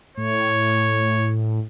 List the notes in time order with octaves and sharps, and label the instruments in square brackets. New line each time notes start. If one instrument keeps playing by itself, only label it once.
[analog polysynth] A2 [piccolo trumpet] C#5